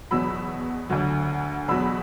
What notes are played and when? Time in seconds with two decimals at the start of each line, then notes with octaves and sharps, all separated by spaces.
0.11 E2 B2 F#3 B5 E6
0.90 D2 D3 F#3
1.68 E2 B2 F#3 B5 E6